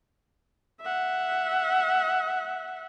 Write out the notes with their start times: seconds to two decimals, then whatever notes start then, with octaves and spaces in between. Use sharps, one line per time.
0.81 E5 F#5